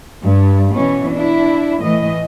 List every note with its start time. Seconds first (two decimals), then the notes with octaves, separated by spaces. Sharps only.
0.22 G2
0.74 B2 E3 C#4
1.14 D4 E4
1.81 A2 E3 A3 D#5